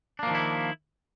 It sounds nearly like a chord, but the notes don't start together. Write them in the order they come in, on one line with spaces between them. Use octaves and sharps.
D4 A#3 F3 D#3 E4